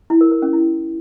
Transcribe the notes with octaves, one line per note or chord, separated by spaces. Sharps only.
E4
A#4
A#4
C#4
E4